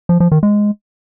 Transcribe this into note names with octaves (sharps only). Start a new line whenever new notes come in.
F3
F3
D#3
G#3